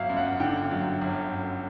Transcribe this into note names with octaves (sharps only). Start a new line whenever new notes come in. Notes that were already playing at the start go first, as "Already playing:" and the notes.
Already playing: G1 F#3 E5 F5
F#2
F#5
D3 G5
F#3
G1
F#2